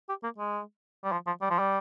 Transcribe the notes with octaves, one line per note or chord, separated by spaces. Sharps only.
G4
A#3
G#3
G3
F3
F3
G3
F3
G3